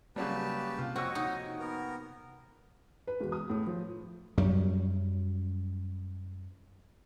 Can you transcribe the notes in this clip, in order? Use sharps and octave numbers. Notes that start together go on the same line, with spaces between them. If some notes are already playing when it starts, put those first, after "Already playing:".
C#3 F#3 G3 A#3 G4 B4 A5
C3 F4
F2 F#4 C5 C#5 D#5 F#5 C#6 E6
D#4
B3 A#4
B4
E1
D#6
A2
F3
F#2 F#3 G3